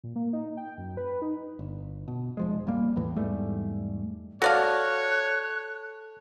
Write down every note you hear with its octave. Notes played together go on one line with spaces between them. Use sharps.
A#2
A#3
D#4
G5
F#2
B4
D#4
G1
B2
F1 F3 G#3
A1 G3 A#3
E2 A2 E3
E2 G#2 G3 A3
F#4 A4 C#5 D5 F5 A5 F#6